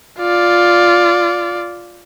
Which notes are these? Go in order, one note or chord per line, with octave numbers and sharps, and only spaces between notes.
F4 D5